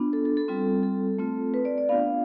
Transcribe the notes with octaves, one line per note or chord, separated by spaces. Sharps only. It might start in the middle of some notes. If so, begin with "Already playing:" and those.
Already playing: B3 D4 F4
A4
A4
A4
G3 C4 F4
A4
A3 C4 F4
B4
D5
D5
B3 D4 F4 F5